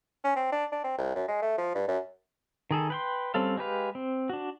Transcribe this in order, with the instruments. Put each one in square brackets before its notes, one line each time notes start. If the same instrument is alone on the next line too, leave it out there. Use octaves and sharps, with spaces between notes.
[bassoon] C#4
C4
D4
D4
C4
C2
F#2
G#3
A3
F3
G2
F#2
[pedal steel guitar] D#3 G#4 A4
B4 G5 C6
G3 C4 C#4 A4 F5
G#3 G4 B4 F5
C4
D4 F#4